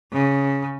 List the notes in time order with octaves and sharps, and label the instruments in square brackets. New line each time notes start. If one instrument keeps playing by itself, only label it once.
[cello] C#3